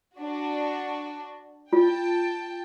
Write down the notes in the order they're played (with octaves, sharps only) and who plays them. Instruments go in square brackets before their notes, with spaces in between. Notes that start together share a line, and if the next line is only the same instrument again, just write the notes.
[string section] D4 F#4
[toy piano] F4 [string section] G5 A5